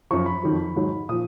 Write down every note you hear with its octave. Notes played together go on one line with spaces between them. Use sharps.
F#2 F3 C#6
B5
F2 D#3 F#3
G#2 D#3 F#3
A#2 F3 D#6